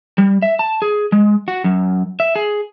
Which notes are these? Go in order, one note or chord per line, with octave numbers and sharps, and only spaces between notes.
G3
E5
A5
G#4
G#3
F#4
F#2
E5
G#4